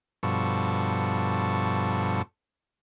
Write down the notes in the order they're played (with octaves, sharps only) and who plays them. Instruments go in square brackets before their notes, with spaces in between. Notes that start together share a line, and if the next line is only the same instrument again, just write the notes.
[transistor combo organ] G2 B2 F3 A4 C#6